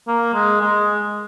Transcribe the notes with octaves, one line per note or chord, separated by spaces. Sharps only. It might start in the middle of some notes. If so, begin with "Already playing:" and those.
A#3
G#3
G#3